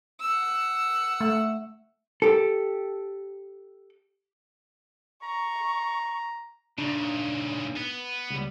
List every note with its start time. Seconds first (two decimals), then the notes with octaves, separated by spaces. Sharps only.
0.20 F#5 E6
1.21 A3
2.22 G4 A4
5.23 A#5 C#6
6.78 A#2 C#3 D4 D#4 B5
7.76 B3
8.30 C#2 G3